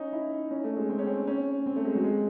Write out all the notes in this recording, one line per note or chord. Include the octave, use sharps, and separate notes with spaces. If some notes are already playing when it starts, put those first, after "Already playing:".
Already playing: C#4 D#4
E4
C#4
A3
G#3
C4
C#4
C4
C#4
C4
A3
G#3
F#3
G#3